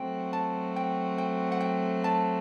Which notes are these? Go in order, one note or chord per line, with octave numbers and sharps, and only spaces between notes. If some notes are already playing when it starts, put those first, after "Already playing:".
Already playing: F#3 A3 C4 F#4 G5
A5
G5
G5
F#5
G5
A5